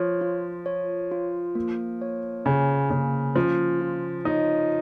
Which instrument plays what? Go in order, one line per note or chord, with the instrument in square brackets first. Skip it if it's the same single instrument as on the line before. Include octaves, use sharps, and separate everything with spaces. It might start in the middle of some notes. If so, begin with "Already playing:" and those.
Already playing: [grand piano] F3 [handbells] C#5
[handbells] F4
C#5
F4
A#3
C#5
[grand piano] C#3 [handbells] G#5
[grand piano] C#3 [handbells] A#3
[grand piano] F3 [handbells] C#4
[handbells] F4
[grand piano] D#4 [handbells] C#5